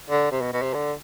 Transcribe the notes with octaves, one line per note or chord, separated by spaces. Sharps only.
D3
C3
B2
B2
C3
D3